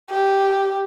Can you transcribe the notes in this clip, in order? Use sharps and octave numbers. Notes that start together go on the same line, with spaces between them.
G4